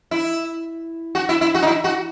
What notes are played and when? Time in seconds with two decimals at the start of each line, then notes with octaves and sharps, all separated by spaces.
0.11 E4
1.15 F#4
1.29 E4
1.41 E4
1.55 F#4
1.62 D#4
1.67 E4
1.84 F#4